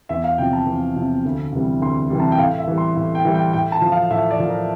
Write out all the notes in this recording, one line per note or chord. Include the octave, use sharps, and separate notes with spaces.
E2 E5
F5
C3 F3 G5
A5
E2
C3 F3
D2
C3 E3 G3
D2 C6
C3 E3 G3
A5
G5
A2 F5
E5
E3 G3
C6
A2
G5
E3 G3
G5
A2 G5
A5
F3
F5
A2 E5
D5
F3
A#4